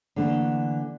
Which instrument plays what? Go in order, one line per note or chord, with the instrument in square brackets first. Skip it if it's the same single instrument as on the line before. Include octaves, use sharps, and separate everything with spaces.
[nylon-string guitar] D3 E3 A3 A#3 D4